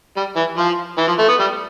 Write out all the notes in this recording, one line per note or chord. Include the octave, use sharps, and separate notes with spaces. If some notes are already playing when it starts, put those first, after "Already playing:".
G3
E3
F3
E3
F3
A3
B3
G3